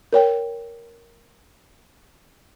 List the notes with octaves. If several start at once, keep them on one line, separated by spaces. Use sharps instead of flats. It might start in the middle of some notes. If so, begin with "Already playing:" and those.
A#4 C#5 G5